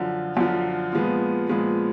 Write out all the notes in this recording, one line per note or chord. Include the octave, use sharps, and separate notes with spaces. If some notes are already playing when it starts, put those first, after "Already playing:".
Already playing: F#2 D3 F3
F#2 D3 F3
A#2 F3 G#3 B3
A#2 F3 G#3 B3